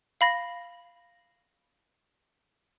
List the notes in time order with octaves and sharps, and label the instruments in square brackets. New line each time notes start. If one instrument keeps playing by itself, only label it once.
[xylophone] F5 B5 A#6